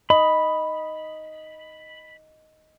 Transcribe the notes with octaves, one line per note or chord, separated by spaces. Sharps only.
D#5 B5